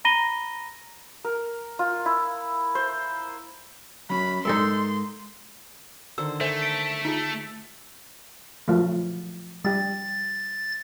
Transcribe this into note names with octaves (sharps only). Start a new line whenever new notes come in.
A#5 B5 A#6 D#7 G7
A#4
F4
E4
C5
F#3 C#4 B5
G#2 D#4 A4 A#4 E5 C6
D3 D#3 C5 E6
A3 A4 C5 E5 G#5
B6 C#7 D7
D#4 F4 G#4
F3 F#3 A3
G3 G4 A6